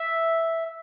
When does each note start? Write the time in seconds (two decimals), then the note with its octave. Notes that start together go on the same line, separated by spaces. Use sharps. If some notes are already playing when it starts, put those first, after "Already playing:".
Already playing: E5